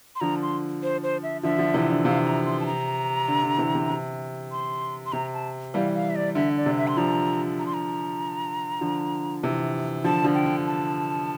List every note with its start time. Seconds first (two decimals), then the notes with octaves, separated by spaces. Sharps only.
0.15 C6
0.20 D3 F3 A#5
0.42 C6
0.83 C5
1.03 C5
1.23 E5
1.43 D3 F3 E5
1.59 D3 F3
1.74 C3 E3
1.90 D3
2.05 C3 F5
2.25 A#5
2.46 C6
2.60 A5
2.66 A#5
3.28 D3
3.43 D3
3.58 C3 E3
3.75 C3
3.90 C3
4.52 C6
5.06 C6
5.12 C3 A#5
5.34 A5
5.74 E3 G3 F5
5.95 F5
6.10 E5
6.16 D5
6.35 D3 E5
6.57 D5
6.66 C3
6.77 E5
6.87 C6
6.97 D3 F3 A#5
7.59 A#5
7.66 C6
7.74 A#5
8.81 D3 F3
9.43 C3 E3
10.04 D3 F3 A5
10.24 D3 F3
10.34 G5
10.46 D3
10.66 A5